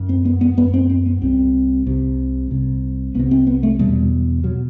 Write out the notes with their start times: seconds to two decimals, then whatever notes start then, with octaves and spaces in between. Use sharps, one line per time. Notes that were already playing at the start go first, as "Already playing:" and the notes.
Already playing: F#2
0.09 C4
0.25 B3
0.41 B3
0.57 F#2 B3
0.74 C4
0.90 C4
1.06 B3
1.22 C2 C3 C4
1.86 C2 C3
2.51 C2 C3
3.15 C2 B3
3.19 C3
3.31 C4
3.47 B3
3.63 A3
3.79 E2 B2 G3
4.43 B2 F#3